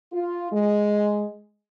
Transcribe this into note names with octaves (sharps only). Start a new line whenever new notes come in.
F4
G#3